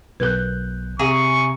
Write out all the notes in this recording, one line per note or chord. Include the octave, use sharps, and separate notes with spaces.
B1 A#4 B4 F#6 G6
C3 G#4 E5 A#5 C#6